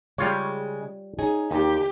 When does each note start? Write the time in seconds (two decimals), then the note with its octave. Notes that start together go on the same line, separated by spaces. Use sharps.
0.18 C#3 G3 G#3 F4 C#5
1.19 C#4 D#4 G#4
1.51 D#2 D#4 G4